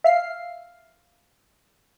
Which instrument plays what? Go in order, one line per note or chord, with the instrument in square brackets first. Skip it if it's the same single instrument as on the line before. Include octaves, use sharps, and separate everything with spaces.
[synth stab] E5 F5 C7